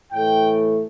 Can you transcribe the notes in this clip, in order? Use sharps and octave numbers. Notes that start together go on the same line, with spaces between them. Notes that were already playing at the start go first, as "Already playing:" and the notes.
A2 E3 A3 G5